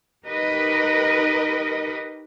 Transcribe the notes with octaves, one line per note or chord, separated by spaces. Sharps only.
D#4 G4 A#4 B4 D#5